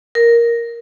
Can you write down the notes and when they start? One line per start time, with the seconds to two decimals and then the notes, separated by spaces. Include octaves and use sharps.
0.15 A#4